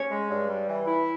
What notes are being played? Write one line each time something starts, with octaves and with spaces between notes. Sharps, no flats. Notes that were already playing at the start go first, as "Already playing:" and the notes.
Already playing: C#4 C#5
G#3
G2
G3
E3
E4